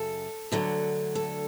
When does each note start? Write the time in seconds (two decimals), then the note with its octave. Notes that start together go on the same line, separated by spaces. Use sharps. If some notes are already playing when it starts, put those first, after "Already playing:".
Already playing: F#2 C#3 F#3 A4
0.52 D2 D3 F#3
1.15 A4